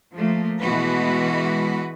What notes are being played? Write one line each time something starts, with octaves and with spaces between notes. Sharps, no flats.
F3 A3 A#3
B2 E3 G#3 F#4 B4